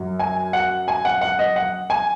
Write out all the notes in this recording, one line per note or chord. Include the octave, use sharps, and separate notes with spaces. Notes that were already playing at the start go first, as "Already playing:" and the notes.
Already playing: F#2 F#3
G#5
F#5
G#5
F#5
F#5
D#5
F#5
G#5